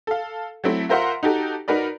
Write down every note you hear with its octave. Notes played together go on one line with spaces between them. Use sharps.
A4 F5
F#3 A3 C4 E4
F4 A#4 C5 E5 F#5 C6
D#4 F#4 G4 A4
D#4 F#4 A#4 B4 D5